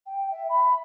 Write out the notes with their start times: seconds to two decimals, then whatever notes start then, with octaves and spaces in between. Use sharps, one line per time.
0.06 G5
0.31 E5
0.49 B5